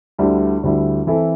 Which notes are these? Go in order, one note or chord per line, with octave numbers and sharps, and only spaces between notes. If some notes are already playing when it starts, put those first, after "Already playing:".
D2 D3 G3 E4
D2 D3 G3 E4
E3 C4 E4 A4